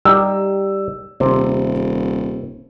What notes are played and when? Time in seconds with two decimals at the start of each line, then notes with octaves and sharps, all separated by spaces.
0.05 G3 D#4 G4 E6
1.20 D#1 C3 C5